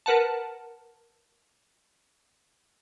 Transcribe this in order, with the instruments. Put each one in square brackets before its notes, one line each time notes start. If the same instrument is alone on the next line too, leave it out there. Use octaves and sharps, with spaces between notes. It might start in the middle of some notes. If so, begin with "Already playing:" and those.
[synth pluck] A#4 B4 F#5 A5